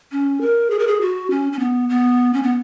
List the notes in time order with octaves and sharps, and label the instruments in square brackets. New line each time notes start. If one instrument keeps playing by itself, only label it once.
[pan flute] C#4
A#4
G#4
A#4
G#4
F#4
C#4
C#4
B3
B3
C#4
B3